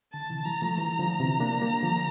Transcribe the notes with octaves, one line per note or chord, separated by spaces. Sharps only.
D3 A5
C3 E3
E3 G3 A#5
F3 A3
E3 G3 A#5
D3 F3
C3 E3
A#3 D4
G3 A#3
D3 F3